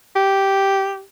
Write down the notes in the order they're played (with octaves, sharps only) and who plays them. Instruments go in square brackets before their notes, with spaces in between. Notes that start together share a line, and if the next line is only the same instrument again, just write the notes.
[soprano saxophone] G4